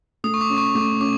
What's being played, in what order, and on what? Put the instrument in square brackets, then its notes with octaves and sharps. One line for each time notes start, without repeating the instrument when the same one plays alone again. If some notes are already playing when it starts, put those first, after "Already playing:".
[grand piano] A3 [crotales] D#6
[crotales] C#6
D6
[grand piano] C#4
[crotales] C#6
[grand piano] A3 [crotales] D6
[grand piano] C#4 [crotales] D6